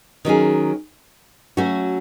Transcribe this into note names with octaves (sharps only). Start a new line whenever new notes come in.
D#3 F#3 C#4 G#4
F#3 A3 C#4 F#4